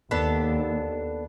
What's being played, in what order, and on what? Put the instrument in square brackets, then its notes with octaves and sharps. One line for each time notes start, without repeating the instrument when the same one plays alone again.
[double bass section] D#2 [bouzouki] B3 D4 A4